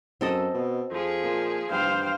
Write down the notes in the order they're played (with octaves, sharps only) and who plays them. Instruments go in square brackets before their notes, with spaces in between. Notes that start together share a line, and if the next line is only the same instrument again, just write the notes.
[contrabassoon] F#2 [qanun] C4 A4 D#5
[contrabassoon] B2
[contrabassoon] F2 [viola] F3 G#4
[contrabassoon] A#2
[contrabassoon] G2 [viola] C5 [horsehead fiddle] F5 G5